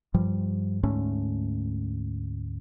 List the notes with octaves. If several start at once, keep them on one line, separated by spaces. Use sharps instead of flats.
G2 F3 G3
D2 G#2 A3 C#4